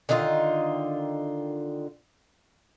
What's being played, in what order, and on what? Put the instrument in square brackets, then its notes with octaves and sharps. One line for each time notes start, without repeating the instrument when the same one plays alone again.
[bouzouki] D3 D#3 D#4 F4